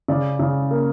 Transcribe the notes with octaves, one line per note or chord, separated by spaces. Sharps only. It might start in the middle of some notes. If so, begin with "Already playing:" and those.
C#3 D5
C#3
A#3